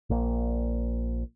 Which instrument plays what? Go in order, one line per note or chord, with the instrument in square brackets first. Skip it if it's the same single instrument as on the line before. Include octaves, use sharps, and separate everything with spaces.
[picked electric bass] A#1 A#2